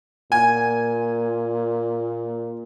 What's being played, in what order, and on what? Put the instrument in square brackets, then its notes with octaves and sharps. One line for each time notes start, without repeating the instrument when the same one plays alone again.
[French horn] A#2 [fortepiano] G#5